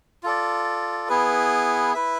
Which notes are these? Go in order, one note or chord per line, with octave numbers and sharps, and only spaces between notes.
F4 A4 D5
B3 E4 G#4 B4
E4 B4 E5